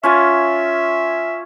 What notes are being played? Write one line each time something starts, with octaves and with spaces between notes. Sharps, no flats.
C#4 F4 E5 G#5